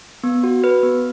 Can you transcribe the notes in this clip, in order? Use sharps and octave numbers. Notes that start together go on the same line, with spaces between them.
B3
F#4
B4
B3